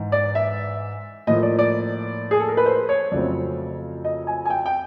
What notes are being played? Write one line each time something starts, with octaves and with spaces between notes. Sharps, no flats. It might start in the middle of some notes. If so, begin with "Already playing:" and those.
Already playing: G#2 E3 G#3
D5
E5
A2 F3 A#3 D#5
D5
D5
G#4
A4
A#4
B4
C5
C#5
F2 C#3 F#3 A3 C4 D5
D#5
G#5
G#5
G5
G5